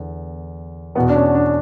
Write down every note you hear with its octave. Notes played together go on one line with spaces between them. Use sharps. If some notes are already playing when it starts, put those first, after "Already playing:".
Already playing: E2 D3
E2 B2 B3
D4
C#4
D4